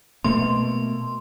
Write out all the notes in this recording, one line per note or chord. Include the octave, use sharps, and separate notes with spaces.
B2 A3 A#3 C6